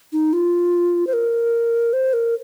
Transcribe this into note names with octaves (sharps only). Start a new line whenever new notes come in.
D#4
F4
C5
A#4
C5
A#4